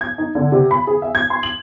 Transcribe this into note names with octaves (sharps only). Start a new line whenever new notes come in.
G#6
D#4
D3
C3
B5
G#4
E5
G#6
C6
F#7